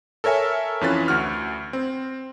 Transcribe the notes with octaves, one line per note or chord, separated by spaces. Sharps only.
A4 A#4 C#5 E5 G#5
F2 E3 C#4 F4 B4 A6
D2 F#4 F6
C4